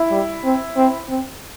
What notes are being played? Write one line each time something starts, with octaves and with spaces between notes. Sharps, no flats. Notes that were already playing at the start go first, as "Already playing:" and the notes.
Already playing: E4
G3
C4
C4
C4